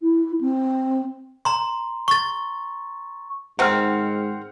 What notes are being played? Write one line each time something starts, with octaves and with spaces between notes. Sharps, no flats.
E4
C4
A#5 C6
C#6 A6
G#2 D#3 C4 F#5 F6